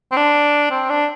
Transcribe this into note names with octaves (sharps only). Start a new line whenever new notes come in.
C4
D4
C4
D4